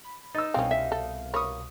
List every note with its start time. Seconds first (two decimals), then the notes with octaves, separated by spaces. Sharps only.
0.04 B5
0.35 D#4 E6 A6
0.54 C2 B2 C4 C#4 F5
0.71 E5
0.92 A4
1.34 A#4 C#5 B5 C#6 D#6